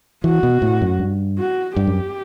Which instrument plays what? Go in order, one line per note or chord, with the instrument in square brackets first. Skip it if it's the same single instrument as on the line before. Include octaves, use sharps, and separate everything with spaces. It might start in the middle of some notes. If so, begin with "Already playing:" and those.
[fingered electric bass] E3 [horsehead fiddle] F#4
[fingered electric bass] B2
A2
F#2
G2
[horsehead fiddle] F#4
[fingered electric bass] G2 [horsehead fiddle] G4
[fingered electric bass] F#2